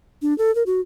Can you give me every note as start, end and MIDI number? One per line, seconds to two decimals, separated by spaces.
0.22 0.36 62
0.38 0.53 69
0.55 0.63 70
0.66 0.81 66